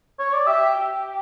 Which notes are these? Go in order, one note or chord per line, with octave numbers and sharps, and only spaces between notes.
C#5
D5
G4 E5
G4